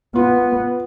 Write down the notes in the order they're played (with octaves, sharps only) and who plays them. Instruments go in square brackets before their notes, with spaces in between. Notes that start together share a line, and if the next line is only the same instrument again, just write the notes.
[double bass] B3 [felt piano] F4